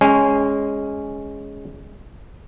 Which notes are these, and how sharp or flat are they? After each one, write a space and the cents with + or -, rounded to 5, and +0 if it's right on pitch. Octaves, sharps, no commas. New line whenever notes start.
G#3 +0 C#4 +0 G#5 -35